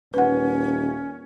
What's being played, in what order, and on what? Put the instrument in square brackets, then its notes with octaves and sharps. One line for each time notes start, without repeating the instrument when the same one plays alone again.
[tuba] D#1 [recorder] C#4 [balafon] B4 F#5